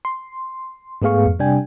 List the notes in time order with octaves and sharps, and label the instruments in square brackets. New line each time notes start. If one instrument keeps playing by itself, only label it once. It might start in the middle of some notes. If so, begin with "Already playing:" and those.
[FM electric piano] C6
G#2 A3 B3 G#4 F5 C#6
F2
C3 G3 D4 G5 G#5